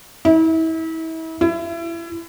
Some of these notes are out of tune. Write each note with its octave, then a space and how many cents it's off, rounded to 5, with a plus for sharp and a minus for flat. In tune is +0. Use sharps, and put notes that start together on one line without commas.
E4 -35
E4 +30